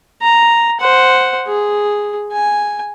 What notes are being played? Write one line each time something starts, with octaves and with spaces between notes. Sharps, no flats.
A#5
C5 F#5
G#4
G#5